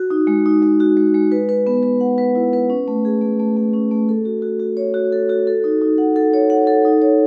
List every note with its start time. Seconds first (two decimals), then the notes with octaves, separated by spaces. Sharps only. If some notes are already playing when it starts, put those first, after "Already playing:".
Already playing: F#4
0.10 D#4
0.27 G#3
0.46 D#4
0.62 G#3
0.80 F#4
0.97 G#3
1.14 G#3
1.32 B4
1.49 B4
1.67 B3
1.83 B4
2.01 F#5
2.18 B4
2.35 E4
2.53 B4
2.70 C#4
2.88 A3
3.05 G#4
3.21 A3
3.40 A3
3.57 A3
3.73 C#4
3.91 A3
4.09 A4
4.25 F#4
4.42 F#4
4.59 F#4
4.77 C#5
4.94 F#4
5.12 A4
5.29 F#4
5.47 A4
5.64 D#4
5.81 D#4
5.98 F#5
6.16 A4
6.34 C#5
6.50 F#5
6.67 A4
6.85 D#4
7.02 C#5